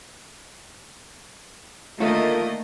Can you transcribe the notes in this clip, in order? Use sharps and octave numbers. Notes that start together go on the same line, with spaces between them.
D3 D#3 A3 A#3 F4 A#4 C#5 D#5